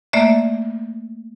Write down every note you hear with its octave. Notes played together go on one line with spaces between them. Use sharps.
A3 A#3 D5 E5